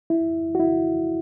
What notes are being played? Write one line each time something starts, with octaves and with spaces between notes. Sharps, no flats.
E4
F#4
E4